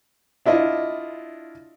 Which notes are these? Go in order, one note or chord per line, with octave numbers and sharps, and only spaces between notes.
D4 E4 F4 D#5